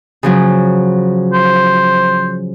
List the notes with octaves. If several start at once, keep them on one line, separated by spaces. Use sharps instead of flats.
C#3 F3 F#3
C5